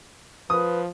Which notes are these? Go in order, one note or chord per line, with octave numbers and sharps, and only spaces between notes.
F3 B4 D#6